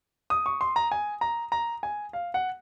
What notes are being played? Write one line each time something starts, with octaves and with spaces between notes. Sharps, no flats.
D#6
C#6
C6
A#5
G#5
A#5
A#5
G#5
F5
F#5